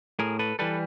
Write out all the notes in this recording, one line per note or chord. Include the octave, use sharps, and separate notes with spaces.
A2 G#4 A#4
A4 B4
E3 G3 A4 B4